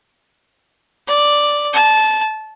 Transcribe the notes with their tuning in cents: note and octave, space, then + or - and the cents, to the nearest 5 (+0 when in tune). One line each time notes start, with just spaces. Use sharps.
D5 +0
A5 -20